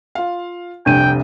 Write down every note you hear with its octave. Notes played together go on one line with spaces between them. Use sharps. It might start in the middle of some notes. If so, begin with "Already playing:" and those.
F4 F5
F1 C2 C3 D4 G5 D#7